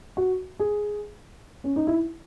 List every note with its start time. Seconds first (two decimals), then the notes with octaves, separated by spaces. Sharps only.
0.17 F#4
0.59 G#4
1.64 C#4
1.76 D#4
1.87 E4